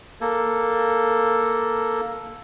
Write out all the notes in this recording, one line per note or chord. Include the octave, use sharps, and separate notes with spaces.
A#3 A4